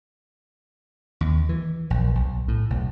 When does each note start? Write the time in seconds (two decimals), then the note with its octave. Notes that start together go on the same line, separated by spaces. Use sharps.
1.21 D#2
1.49 E3
1.90 A#1
2.15 B1
2.48 A2
2.70 B1